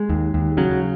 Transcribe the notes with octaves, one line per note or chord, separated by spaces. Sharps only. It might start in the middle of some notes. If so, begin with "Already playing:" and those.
Already playing: G#3
D#2
D#2
C#3 F#3